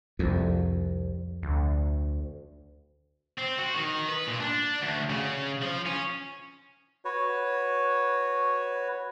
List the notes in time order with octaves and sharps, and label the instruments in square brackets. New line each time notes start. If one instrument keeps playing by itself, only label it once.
[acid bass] C2 [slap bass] F2
[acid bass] D2
[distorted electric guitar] C4
F#4
D#3
B4
A#2
D4
D2
C#3
F3
C#4
[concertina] F#4 B4 C#5